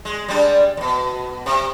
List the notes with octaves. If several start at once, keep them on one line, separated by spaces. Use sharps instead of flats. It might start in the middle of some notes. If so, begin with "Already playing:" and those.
G#3
G3 G#3 D4
F2 B2
C3